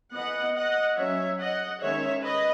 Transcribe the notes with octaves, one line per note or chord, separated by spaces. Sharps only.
E3 B3 D#5 F#5
D#5 F#5
F#3 C#4 C#5 E5
D#5 F#5
D#3 G#3 C#4 C#5 E5
B4 D#5